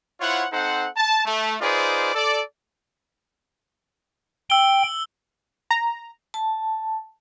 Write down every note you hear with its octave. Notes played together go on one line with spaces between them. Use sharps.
E4 F4 C5 C#5 F#5
C4 D#4 A4 C5 F#5
A5
A3
D#4 F4 G#4 B4 C5 D5
A4 D5
G5 E6 G7
A#5
A5